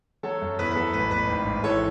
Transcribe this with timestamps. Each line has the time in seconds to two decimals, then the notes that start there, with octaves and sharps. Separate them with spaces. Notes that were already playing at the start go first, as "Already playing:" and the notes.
0.23 F#3 A4 C#5
0.41 F#2
0.59 E2 B4
0.71 B4
0.76 F#3 A4
0.94 A1 B4
1.11 A1 B4
1.29 G#1
1.46 G#1
1.64 E3 A4 C#5